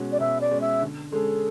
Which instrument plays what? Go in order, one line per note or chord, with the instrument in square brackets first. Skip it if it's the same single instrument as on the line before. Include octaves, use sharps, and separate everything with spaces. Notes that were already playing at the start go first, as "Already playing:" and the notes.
Already playing: [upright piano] B2 G#3 C#4 F#4
[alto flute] D5
[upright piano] B2 [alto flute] E5
[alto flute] D5
[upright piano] G#3 C#4 F#4
[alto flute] E5
[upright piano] D3
[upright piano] G#3 C#4 G#4 [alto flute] A4